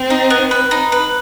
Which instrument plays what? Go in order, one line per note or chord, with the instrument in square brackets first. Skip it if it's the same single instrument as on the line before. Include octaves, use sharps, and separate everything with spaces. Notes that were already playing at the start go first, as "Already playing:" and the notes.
Already playing: [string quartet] C4
[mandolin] D#4
B3
B4
D#4
B4